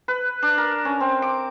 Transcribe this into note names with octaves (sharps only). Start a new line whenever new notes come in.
B4
D4
A#4
C#4
C4
D6